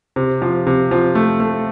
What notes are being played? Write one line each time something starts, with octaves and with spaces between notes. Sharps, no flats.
C3
F3
C3
F3
A3
A3